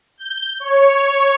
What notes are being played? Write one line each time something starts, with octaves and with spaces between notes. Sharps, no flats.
G6
C#5